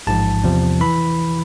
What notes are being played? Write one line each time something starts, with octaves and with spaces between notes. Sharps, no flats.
A1 G#2 F3 A5
E2 C3 F3
E3 B5